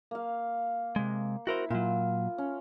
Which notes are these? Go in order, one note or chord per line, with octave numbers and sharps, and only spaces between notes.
A#3 F5
C3 G#3
E4 F#4 A#4 C5 E5
A#2 F#3 F4
C#4